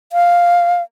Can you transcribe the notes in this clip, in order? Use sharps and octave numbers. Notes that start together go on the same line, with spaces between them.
F5